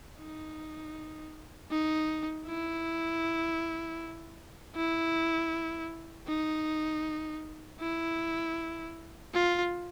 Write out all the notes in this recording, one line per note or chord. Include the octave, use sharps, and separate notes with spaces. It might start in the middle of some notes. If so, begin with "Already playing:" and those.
D#4
D#4
E4
E4
D#4
E4
F4